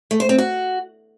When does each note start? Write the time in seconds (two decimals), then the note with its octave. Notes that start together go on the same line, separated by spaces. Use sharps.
0.11 A3
0.20 C5
0.29 C4
0.38 F#4